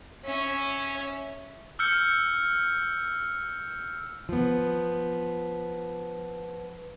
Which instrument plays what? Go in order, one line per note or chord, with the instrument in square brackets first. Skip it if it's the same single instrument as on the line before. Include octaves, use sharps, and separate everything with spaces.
[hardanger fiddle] C#4 E5
[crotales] E6 F6 G6 C#7
[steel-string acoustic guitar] F3 B3